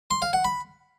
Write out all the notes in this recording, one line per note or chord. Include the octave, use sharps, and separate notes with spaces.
C6
F5
F#5
B5